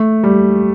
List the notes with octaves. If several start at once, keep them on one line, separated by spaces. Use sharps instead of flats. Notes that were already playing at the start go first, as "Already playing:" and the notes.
Already playing: A3
G3